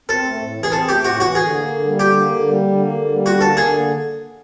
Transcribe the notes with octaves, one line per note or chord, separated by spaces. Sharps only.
C4 A4
A3
A2
E3
G#4
C4 A4
A3 G4
A2 F#4
E3 F#4
D3 G#4
A#3
D3
G3
D3 G4
A#3
D3
G3
D3
A#3
D3
G3
D3 F#4
A#3 A4
D3 G#4